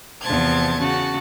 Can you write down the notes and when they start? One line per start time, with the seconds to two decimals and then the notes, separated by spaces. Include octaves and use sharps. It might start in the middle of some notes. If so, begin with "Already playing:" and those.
0.22 E2 C3 F3 C5 A5 G#6
0.78 C#3 C#4 F#4 A5